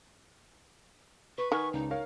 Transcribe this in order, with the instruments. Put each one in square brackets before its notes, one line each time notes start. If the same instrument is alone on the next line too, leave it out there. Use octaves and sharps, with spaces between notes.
[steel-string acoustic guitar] B4 [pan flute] C#6
[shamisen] D#3 [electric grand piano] F#5 G#5 F6 [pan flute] C#6
[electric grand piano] C#2 C#3 [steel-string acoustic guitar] D4 [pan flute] D#4
[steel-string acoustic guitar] F#2 A2 [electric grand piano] A#4 C#5 F5